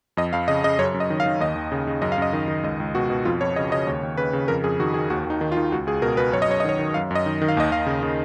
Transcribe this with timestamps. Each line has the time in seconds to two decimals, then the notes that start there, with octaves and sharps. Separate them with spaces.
0.17 F2 D#5
0.33 F2 F5
0.48 C#3 D#5
0.64 C#3 D#5
0.79 F#2 C#5
0.94 F#2
1.00 D#5
1.10 D#3
1.20 F5
1.26 D#3
1.40 D#2 D#5
1.56 D#2
1.72 C#3
1.87 C#3
2.02 F#2 D#5
2.12 F5
2.18 F#2 D#5
2.33 D#3
2.48 D#3
2.63 C#2 D#5
2.80 C#2
2.95 B2 F#4
3.10 B2
3.25 F2 F4
3.41 F2 C#5
3.56 C#3 D#5
3.72 C#3 D#5
3.87 D#2 C#5
4.03 D#2
4.17 C#3 B4
4.33 C#3
4.48 F2 A#4
4.64 F2 G#4
4.80 D#3 F#4
4.94 D#3 G#4
5.10 D#2 F#4
5.26 D#2 D#4
5.41 D#3
5.52 F4
5.57 D#3
5.72 C#2 F#4
5.87 C#2 G#4
6.02 B2 A#4
6.17 B2 B4
6.33 F#2 C#5
6.42 D#5
6.48 F#2 C#5
6.60 D#5
6.65 D#3 C#5
6.79 D#3
6.94 F#2 F5
7.11 F#2 D#5
7.26 D#3
7.42 D#3
7.48 F5
7.57 D#2 D#5
7.71 D#2 F5
7.86 C#3
8.03 C#3